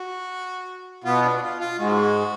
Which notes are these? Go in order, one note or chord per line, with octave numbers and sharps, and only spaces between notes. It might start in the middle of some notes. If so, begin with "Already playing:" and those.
Already playing: F#4
B2 B3 F4
D4
F4
F4
G#2 G#3 F#4